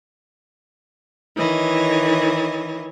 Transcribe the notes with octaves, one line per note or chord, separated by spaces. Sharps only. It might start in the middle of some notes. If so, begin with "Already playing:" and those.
D#3 E3 C#5 D#5